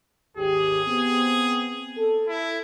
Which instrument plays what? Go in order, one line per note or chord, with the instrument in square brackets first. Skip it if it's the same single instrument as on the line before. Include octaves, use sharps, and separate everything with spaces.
[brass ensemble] G#1 D#2 G4 [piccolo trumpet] G#4
[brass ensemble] B3 C4
A4
[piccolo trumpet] E4